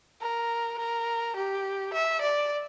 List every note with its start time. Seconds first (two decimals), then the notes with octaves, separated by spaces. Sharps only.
0.21 A#4
0.78 A#4
1.36 G4
1.93 E5
2.21 D5